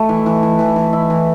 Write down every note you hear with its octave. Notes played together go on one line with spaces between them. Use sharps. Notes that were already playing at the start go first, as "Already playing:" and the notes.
Already playing: A3
E3
E3
E3
E3
E3
E4
E3